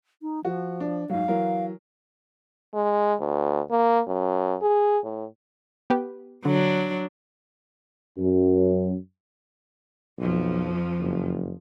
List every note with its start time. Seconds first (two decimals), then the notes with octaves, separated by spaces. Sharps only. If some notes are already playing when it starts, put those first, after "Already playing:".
0.22 D#4
0.45 F3 F#4
0.80 D4
1.10 G#2 F#3 F5
1.28 E3 F#3 A#4
2.74 G#3
3.20 D2
3.71 A#3
4.07 F#2
4.62 G#4
5.04 A2
5.90 B3 G4 B4
6.45 D3 F#3 D4
8.18 F#2
10.18 B1 F2 F3
10.99 F#1